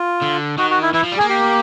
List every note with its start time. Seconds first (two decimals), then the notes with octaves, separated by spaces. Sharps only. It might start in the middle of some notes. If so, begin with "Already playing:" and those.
Already playing: F4
0.22 D3
0.58 D#3 F#4
0.70 F#4
0.82 E4
0.93 E3 E4
1.03 F3
1.12 G3
1.18 A#3 G#4
1.29 G4